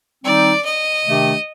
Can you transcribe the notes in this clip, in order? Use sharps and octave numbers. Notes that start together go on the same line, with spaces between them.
D#3 G3 C4 D#4 D5
D#5
C3 D#3 A3 D4 G4